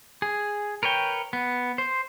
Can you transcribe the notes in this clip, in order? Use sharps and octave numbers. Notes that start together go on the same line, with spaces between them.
G#4
A#4 B4 C#5 G5
B3
C5